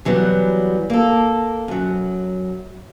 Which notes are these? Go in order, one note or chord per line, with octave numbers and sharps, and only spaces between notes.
E3 F#3 G3 B3
A#3 A4
F#2 F#3